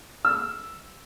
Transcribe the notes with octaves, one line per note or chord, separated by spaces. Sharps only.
E6